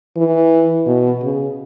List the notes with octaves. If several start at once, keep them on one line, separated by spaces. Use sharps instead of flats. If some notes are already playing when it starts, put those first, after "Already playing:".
E3
B2
C#3